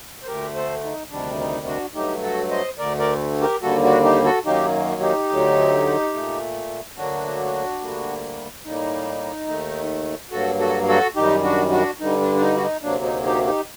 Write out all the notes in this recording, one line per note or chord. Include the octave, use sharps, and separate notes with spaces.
C5
D2 D3 A3 G4 A#4
A4 C5
D#4
D2 C3 D#3 G3 D4
D#4
D4 F#4
G2 F#3 A3 D#4 G4
F#4 A4
C5 D#5
D2 D3 A3 A#4 D5
A#4 D5
G4 A#4
D#2 D3 G3 A#3 F#4 A4
D4 F#4
D#4 G4
F#4 A4
F#2 D#3 F#3 A#3 D#4 G4
D#4 G4
D2 D3 F#3
A#2 A3
D2 D3 F#3 A#3 D4 F#4
D2 D3 G3 A#3
A2 G3 A#3 D#4
D#2 D#3 A3
G2 F#3 A#3 F#4 A4
F#4 A4
F#4 A4
F#2 D#3 G3 D#4 G4
D4 F#4
D4 F#4
G2 D3 G3 D#4
D4
D4
D#4
F#4
D#4
D2 C3 F#3 A#3 D4
D#4
D#4 G4
D#4 G4